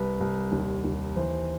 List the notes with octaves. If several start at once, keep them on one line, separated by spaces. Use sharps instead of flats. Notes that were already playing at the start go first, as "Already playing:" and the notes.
Already playing: C2 B4
C2
D#2
D#2
E3 C5